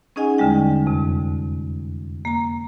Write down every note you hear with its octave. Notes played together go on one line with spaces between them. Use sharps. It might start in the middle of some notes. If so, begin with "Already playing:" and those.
C#4 D#4 G#4 D#5 F#5 G#5
E2 D3 G3 G#3 G5
F2 C3
A#3 A#5